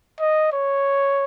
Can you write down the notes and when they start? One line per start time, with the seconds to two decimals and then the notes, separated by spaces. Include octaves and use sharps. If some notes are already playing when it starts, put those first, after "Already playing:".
0.20 D#5
0.53 C#5